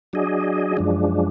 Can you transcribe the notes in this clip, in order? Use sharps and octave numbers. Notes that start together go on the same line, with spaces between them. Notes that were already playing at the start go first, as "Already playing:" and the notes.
F#3 D4 G#4 D#5
F#2 F3 G#3 D4